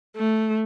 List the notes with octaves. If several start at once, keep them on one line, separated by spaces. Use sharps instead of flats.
A3